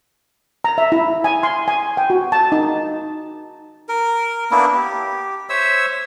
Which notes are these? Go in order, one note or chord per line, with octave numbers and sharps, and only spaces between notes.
A#5
E5
E4
G#5
C6
G#5
G5
F#4
A5
D#4
A#4
A#3 B3 D4 E4
G4
C5 C#5 E5 E6